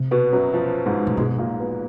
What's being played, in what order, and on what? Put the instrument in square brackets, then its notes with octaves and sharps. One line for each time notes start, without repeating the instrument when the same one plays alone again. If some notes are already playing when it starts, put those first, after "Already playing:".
Already playing: [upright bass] C3
[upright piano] B2 B3
F#2 F#3
F3
G#2 G#3
[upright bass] A#2
[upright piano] G#2 G#3 [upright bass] B2
[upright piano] A#2 A#3
B2 B3